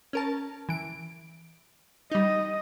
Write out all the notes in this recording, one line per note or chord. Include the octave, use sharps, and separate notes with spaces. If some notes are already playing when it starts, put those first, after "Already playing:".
C#4 A#4 A5
E3 D7
G3 D#4 D#5